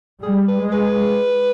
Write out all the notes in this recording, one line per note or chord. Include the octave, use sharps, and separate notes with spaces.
G3 G#4
B4
G#3
B4